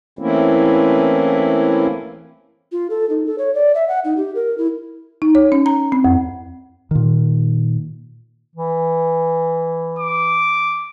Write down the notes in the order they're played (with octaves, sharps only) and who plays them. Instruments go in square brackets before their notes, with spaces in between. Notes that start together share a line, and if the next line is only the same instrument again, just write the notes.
[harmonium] E3 A3 A#3 C4 C#4 E4
[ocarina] F4
A4
D#4
A4
C#5
D5
E5
F#5
D#4
G4
A#4
E4
[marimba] D#4
C#5
C#4
A#5
C4
F2
[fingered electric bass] A#2 D#3
[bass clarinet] E3
[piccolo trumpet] D6